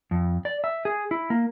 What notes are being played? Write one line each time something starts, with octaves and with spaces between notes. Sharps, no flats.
F2
D5
E5
G#4
E4
A#3